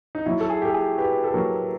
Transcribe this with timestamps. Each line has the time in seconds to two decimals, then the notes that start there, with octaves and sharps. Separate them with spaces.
0.15 D#4
0.26 F#3 E4
0.40 A4
0.50 G#4
0.62 G4 A4
0.74 G#4
0.98 G4 B4
1.24 A4
1.34 F#3 A#4